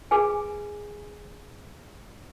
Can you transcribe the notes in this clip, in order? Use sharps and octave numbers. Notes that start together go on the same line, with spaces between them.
G#4 B4 G#5